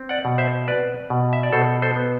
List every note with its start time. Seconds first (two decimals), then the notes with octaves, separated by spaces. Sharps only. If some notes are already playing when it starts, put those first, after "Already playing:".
Already playing: C4
0.09 D5 F#5
0.25 B2
0.38 C5 E5
0.67 C4 B4 D5
1.10 B2
1.33 E5
1.43 D5
1.53 B2 A4 C5
1.82 A4 C5
1.96 B3